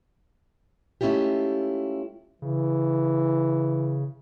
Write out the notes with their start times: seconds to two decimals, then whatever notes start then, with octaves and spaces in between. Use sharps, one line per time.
1.01 G#3 A3 C#4 E4 F4 G4
2.42 C#3 E3